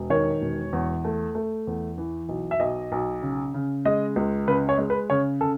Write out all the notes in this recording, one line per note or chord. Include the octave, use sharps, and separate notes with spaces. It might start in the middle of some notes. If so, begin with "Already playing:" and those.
Already playing: E1
D#3 C#5
E1
E2
A3
A3
E2
E3
B1
E5
B1 D#5
B1
C#3
C#3
G#3 D#5
C#2
C#3 B4
C#5
G#3
B4
C#3 C#5
C#3 A4